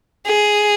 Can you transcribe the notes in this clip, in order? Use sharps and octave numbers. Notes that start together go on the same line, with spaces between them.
G#4